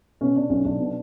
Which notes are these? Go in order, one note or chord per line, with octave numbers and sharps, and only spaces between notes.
B2 C#4
B2 D4
B1 C#4
B1 D4
B2